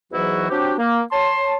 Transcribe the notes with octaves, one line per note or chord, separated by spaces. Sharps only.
E2 G#2 E3 F#3 E4 F#4
F#3 C4 D4 F#4 G4
A#3
C#5 A5 C6